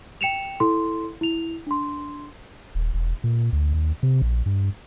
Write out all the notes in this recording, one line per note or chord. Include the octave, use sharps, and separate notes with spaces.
G5 C#7 E7 F7
E4 A4 C6
E4 F7
D4 C6
D#1
E1
A#2
D2
D#2
C3
A#1
G2